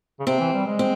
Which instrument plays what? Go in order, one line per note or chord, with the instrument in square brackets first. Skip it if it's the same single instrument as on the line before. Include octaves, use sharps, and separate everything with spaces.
[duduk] C#3
[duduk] C3 [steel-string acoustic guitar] C4
[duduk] E3
G3
G#3
[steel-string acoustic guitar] C4